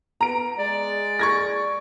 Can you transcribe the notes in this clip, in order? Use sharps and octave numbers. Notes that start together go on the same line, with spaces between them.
B3 A#5 D7
G#3 D5
C#6 G#6 A#6